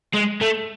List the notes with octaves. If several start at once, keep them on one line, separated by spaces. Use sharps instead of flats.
G#3
A3